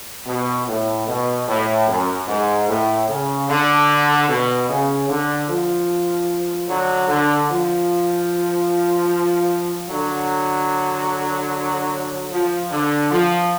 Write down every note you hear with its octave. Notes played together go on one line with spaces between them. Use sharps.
B2
A2
B2
A2
F#2
G#2
A2
C#3
D3
B2
C#3
D3
F3
D3 F#3
D3
F3
D3 F#3
F3
D3
F3